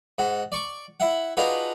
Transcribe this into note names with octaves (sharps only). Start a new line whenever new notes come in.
G#2 F#4
D5 C#6 D6
E4 E5 F#5
D4 D#4 F4 F#4 G#4 B4